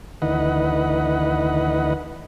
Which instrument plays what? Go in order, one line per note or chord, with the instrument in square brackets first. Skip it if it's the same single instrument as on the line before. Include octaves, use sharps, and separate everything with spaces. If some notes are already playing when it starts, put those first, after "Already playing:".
[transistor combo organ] D2 D#3 E3 B4 D#5 F#5